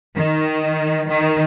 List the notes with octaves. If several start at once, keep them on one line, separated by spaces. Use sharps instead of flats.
D#3
D#3